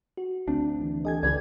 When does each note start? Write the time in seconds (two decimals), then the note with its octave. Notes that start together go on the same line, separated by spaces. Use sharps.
0.17 F#4
0.48 D2 C4 D4
0.82 E3
1.05 E3 G4 A4 D#5 G#5 G#6
1.23 C#2 B4 D5 G#6